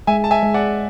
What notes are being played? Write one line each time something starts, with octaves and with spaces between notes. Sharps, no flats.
G#3 E5 G#5
A5
E5 G#5
G#3
D5 F#5